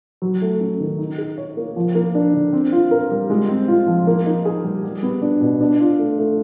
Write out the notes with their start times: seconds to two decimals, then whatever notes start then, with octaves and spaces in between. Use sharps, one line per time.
0.22 F#3
0.42 A3
0.61 C#4
0.80 D#3
0.99 D#4
1.18 G#4
1.38 C#5
1.57 A#3
1.76 F3
1.95 A#3
2.15 D4
2.34 D3
2.53 C4
2.72 F4
2.91 A#4
3.11 G3
3.30 G#3
3.49 C4
3.68 F4
3.87 F3
4.07 A#3
4.26 D#4
4.45 G#4
4.64 G3
4.84 G3
5.03 B3
5.22 D4
5.41 B2
5.60 D4
5.80 F4
5.99 A3
6.19 A3